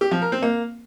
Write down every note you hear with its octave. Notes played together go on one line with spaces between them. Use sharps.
G4
F3
A#4
C4
A#3